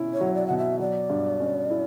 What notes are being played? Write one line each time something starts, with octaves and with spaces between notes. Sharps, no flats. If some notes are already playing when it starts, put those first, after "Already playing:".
Already playing: B2 C#4 E4
C#5
F#3
D5
B2 F#5
E5
F#3 D5
G2
C#4
E4